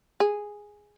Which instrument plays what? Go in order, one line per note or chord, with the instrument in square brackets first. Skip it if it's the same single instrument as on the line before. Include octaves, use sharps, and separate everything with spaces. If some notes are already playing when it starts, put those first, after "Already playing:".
[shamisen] G#4